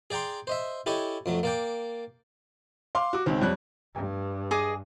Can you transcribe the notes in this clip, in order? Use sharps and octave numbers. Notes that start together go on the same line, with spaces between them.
G#4 D5 G5 A#5 C6
C5 D#5 E5
E4 G4 A4 C#5 D#5 G#5
F2 F#3 A3
A#3 D5 G5
F5 C6 D6
F#4 D6
C#2 D#3 C4
F2 G3 C#5 F#6
G2
G#4 D#5 D6